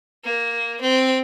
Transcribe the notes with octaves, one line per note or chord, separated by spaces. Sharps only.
A#3
C4